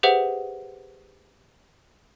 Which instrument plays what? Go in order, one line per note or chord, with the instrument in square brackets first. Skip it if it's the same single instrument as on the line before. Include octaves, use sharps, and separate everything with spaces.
[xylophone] G4 G#4 B4 C5 E5 F#5